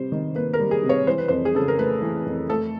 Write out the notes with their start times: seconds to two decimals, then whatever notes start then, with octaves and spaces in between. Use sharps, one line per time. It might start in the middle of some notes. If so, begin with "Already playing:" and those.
Already playing: C3 G3 C5
0.12 D#3
0.35 A#3 B4
0.53 A#4
0.59 G3
0.71 G#4
0.83 C3
0.89 C#5
1.07 E3 C5
1.18 B4
1.28 F2 C5
1.45 G#4
1.55 C#3 A4
1.68 A#4
1.78 A3 B4
2.02 E3
2.26 F2
2.50 A3 A4